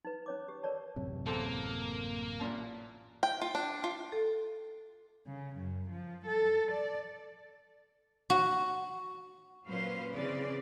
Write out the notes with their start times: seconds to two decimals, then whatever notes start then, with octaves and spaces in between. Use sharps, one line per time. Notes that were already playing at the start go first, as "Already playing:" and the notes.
0.05 D#4 B4
0.26 C#4 C#5 D6
0.48 G4
0.63 A#4 B4 C#5 D5 A5
0.96 A1 F#2 C3
1.26 E2 A#3 C4 A4
2.40 A1 A#2 A5
3.23 G5
3.41 F4
3.55 D4
3.84 F4
4.12 A4
5.26 C#3
5.56 F#2
5.90 F3
6.26 A4
6.72 D5
8.30 F#4
9.66 A#2 F#3 C#4 B4 C5 F5
10.13 C#3 E3 C4 D5